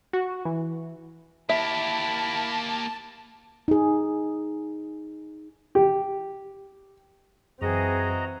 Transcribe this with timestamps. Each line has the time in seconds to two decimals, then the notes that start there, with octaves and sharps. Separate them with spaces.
0.13 F#4
0.45 E3
1.49 A#3 E4 G4 E5 A5
3.68 D#4 G#4
5.75 G4
7.61 F#2 E3 C4 F#4 G#4 D#5 A#5